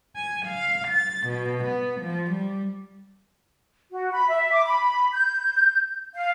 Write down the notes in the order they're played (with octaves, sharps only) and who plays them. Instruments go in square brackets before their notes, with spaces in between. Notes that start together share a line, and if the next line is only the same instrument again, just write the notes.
[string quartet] G#5
F5
A6
B2
B3
F3
G3
[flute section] F#4
B5
E5
D6
B5
G6
F5